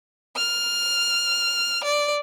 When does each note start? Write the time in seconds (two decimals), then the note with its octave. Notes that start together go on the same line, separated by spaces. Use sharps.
0.37 F6
1.84 D5